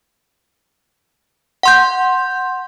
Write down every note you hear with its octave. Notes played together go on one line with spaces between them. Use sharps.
F#5 C6 G6